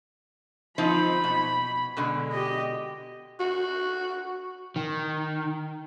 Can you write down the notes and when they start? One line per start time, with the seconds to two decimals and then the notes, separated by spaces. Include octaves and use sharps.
0.78 F3 C4 D#4 B5
1.24 B2
1.97 B2 D3 G#3
2.32 G4 D#5
3.40 F#4
4.76 D#3